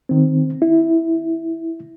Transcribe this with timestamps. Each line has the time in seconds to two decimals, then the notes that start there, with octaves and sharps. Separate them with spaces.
0.09 D#3 C4
0.62 E4